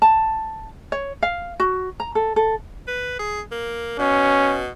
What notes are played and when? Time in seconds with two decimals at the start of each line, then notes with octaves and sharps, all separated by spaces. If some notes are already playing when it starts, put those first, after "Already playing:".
0.02 A5
0.92 C#5
1.23 F5
1.60 F#4
2.00 A#5
2.15 A4
2.36 A4
2.88 B4
3.19 G#4
3.51 A#3
3.99 B2 C#4